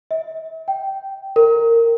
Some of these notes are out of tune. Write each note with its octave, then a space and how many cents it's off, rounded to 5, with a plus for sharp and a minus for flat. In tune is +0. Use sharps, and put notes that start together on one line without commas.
E5 -45
G5 -10
A#4 -15